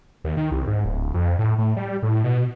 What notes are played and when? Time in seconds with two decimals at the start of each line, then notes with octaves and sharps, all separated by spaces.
0.24 D#2
0.37 D#3
0.51 C2
0.67 G#2
0.85 D1
1.14 F2
1.39 A2
1.58 A2
1.76 G3
2.03 A2
2.24 B2